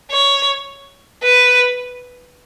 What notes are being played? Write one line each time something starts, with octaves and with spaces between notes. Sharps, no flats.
C#5
B4